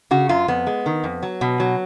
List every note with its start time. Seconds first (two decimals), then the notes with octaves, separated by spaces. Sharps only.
0.11 C#3 F#4
0.29 F#2 F4
0.48 F2 B3
0.67 G#3
0.86 D#3
1.04 F2
1.23 F#3
1.41 B2
1.60 F#3